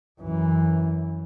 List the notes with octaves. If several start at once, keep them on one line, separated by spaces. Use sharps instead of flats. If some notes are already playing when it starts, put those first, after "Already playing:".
F#2 E3